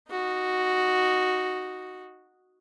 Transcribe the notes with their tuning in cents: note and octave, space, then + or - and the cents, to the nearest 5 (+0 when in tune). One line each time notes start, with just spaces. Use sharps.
D#4 +0 F#4 +0